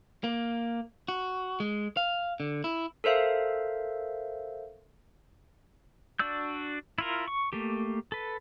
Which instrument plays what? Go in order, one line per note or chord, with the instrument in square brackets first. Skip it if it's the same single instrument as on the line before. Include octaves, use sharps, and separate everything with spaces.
[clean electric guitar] A#3
F#4
G#3
F5
D3
E4
[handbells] A4 A#4 C5 E5 F5
[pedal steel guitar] D4 F#4 D5 E6 G6
E4 F4 A#4
C#6
A3 A#3 G4
A4 B4